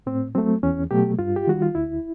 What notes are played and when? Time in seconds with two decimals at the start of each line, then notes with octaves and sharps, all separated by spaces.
0.06 A2 C4
0.35 F#3 A3 C4
0.63 E2 C#4
0.91 B2 F#3 A3 G4
1.19 G2 F4
1.36 G4
1.47 D#3 G3 F#4
1.62 F4
1.75 D2 E4